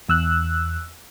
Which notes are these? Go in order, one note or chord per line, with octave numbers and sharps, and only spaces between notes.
E2 E6 F#6